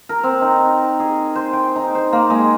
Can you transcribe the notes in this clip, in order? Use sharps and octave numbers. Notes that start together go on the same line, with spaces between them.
A#4
C4
D#4
G#4
C5
G5
D#4
C5
A#3
G#3